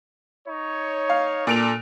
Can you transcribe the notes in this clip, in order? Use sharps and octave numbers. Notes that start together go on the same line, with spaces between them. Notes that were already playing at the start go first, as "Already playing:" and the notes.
D#4 C#5
F5
A#2 D4 A4 D7 F7